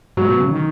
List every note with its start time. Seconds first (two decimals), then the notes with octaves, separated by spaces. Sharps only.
0.17 G#2 F#3
0.29 B2
0.39 C#3
0.51 D#3